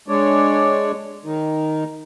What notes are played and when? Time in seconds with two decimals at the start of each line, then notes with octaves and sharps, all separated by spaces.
0.08 G#3 D4 C#5 D5
1.25 D#3 D#4